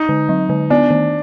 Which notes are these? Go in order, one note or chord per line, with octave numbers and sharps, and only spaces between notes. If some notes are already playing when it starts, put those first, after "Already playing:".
Already playing: D#4
D3
F#3
D3
B3 D4
D#3